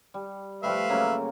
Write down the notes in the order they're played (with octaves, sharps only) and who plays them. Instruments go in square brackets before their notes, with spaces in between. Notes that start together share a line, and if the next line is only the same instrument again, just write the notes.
[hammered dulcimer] G3
[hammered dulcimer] F3 G3 A3 [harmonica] B4 E5 F5
[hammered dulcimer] C#3 F#3 A#3